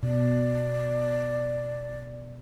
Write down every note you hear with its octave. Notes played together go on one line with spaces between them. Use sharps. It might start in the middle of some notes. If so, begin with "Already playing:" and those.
B2 D5